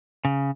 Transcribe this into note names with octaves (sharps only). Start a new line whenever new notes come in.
C#3